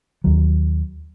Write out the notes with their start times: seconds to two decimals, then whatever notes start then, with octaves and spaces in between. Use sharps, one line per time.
0.24 D#2 D#3 F#3